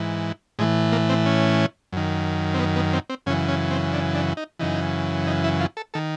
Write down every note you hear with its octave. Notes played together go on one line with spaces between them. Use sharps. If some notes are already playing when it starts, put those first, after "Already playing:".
Already playing: G#2 E3
A2 E3 G#3
A#3
C4
C#4
F#2 D#3
C4
B3
B3
C4
C4
F#2 C#3 E3 C#4
C#4
C4
D4
D4
D#4
F#2 C#3 E3 D#4
D#4
E4
F4
A4
D#3 A4